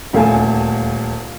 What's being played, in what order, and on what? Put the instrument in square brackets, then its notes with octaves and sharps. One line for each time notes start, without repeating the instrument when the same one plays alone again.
[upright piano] D#1 D2 A#3 F5 G#5 A5